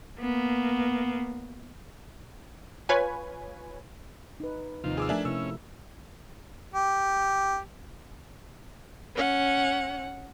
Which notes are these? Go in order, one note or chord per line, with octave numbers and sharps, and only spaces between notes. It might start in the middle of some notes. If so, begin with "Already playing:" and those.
A#3 B3
F4 B4 C#5 G#5
D#4 B4
D#2 C3 F3 D#4 F4
G#4 D6 E6
F3 A3 D4 A#4 E5 G#5
C3 C#4 E4 E6
G4
C#4 F#5